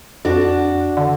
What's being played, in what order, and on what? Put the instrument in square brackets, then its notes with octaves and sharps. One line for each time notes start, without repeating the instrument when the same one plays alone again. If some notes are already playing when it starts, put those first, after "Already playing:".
[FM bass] F2 [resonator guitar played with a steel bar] D4 F#4
[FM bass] D3